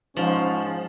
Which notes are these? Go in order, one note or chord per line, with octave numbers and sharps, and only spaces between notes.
G#2 F3 C#4